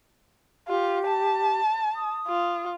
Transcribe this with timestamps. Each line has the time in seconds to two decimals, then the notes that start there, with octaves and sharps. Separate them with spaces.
0.68 F4 G4
1.07 A5
1.96 D#6
2.28 F4